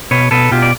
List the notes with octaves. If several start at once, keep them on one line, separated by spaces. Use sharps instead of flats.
B2 B4 C#5
B2 A4 B4
B2 F4 G4
D5